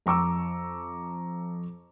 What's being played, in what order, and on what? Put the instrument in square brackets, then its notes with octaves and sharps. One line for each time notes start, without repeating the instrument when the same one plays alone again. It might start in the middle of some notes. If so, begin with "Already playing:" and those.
[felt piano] F2 A#5 C#6 D6 E6